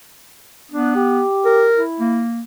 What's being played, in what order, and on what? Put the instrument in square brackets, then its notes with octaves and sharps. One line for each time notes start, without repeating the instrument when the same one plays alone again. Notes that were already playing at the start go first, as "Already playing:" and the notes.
[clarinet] B3 [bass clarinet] D4
[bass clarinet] G4
[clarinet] A#4
[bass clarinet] E4
[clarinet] A#3